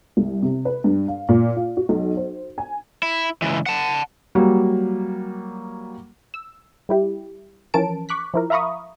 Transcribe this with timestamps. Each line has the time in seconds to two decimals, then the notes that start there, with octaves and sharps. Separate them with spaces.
0.17 C2
0.42 C3
0.65 B4
0.84 G2
1.08 F5
1.29 A#2
1.56 F4
1.77 F#4
1.89 B1
2.17 C5
2.58 G#5
3.03 E4
3.42 C#2 E3
3.66 F#5 A5
4.35 F#3 G3 A#3
6.34 E6
6.89 G3 E4 G4
7.74 E3 F3 C#4 A#4 A5 D7
8.09 C#6 D6 F#6 B6
8.34 F3 E4 A#4
8.50 E5 F5 A#5 B5 C#6 D#6